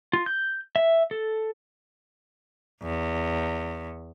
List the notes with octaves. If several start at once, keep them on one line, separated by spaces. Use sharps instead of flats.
F4
G6
E5
A4
E2